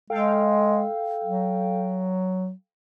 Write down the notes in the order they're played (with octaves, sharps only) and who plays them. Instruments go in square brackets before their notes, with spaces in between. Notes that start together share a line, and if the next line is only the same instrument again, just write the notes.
[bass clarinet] G#3 [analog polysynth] A4 F5 G5
[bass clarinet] F#3